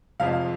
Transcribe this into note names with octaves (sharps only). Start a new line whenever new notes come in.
F1 F2 F3 G#3 F5